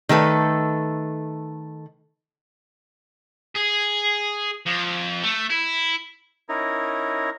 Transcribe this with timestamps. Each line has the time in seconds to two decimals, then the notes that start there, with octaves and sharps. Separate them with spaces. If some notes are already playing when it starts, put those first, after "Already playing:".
0.09 D#3 A3 A4 B4
3.56 G#4
4.66 F2
5.23 A3
5.50 E4
6.49 C#4 D#4 E4 A#4